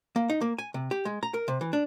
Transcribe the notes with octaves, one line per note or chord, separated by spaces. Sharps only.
A#3
D#4
A#3
G#5
C3
G4
G#3
A#5
A#4
C3
E3
D4